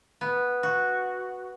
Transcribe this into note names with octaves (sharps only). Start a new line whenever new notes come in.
B3
F#4